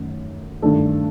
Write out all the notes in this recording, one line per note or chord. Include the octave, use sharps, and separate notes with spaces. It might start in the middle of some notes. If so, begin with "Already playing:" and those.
Already playing: F#2 D#3 F#3 A3
G2 D#3 A3 D4 A4